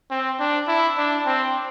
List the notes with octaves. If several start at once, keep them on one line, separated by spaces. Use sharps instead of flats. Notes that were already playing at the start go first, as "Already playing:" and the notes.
C4
D4
E4
D4
C4